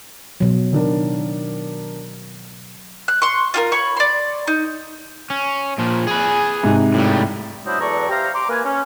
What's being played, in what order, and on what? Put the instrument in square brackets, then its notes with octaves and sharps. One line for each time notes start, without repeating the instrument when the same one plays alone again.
[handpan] B2 F#3
[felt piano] D#3 D4 A#4
[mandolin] F#6
C6 C#6
F4 F#4 A#4
C#5 B5 C#6
D5 C6
D#4
[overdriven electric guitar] C#4
A#2 F3
G#4 B4
[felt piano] G#2 C3 D#4
[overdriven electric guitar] A2 G3
[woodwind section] F#3 B3 D4 E4 C5 D#5
E2 F#3 A4 D5 A#5 C#6
G4 C5 E5 F5 G5 A#5
A#5 C6 D6
A#3 B4 G#5
C#4